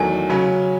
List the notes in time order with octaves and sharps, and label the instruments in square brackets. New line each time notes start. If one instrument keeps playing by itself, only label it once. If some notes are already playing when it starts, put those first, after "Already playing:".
Already playing: [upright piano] E2 D#3 F#3 A3 [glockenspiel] G#5
[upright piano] C#3 F#3 C#4